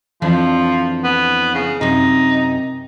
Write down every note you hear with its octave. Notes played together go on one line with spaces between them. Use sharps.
F2 E3 F3 D4
B3
C#3
F#2 C3 D#4